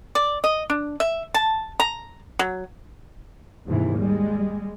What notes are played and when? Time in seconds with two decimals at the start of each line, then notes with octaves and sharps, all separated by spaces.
0.15 D5
0.44 D#5
0.70 D4
1.00 E5
1.34 A5
1.80 A#5
2.39 F#3
3.66 D#2 G#2 C3 E3
3.98 G3 G#3